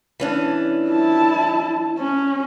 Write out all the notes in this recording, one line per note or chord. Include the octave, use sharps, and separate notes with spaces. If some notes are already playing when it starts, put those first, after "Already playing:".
E3 C#4 D4
E4 A5
C#4